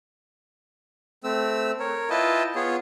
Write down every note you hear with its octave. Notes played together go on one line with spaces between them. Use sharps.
A3 C4 E6
A#4 C#5
E4 F4 B4 D#5 G5 A5
B3 F4 G#4 C#5